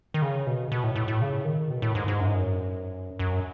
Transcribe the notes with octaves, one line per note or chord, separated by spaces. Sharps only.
D#3
C#3
B2
B2
A2
A2
A2
C#3
D#3
B2
A2
G#2
G#2
F#2
G#2
F#2
F#2